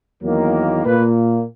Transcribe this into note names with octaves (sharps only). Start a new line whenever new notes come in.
E2 D#3 F#3 A#3
A#2 A#3 B4